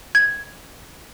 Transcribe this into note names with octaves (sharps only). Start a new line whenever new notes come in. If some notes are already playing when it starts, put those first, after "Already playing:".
G#6